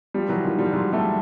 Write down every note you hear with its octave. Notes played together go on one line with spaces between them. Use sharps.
F3 G3
E3 F#3
D#3 F3
F3 G3
F#3 G#3
G3 A3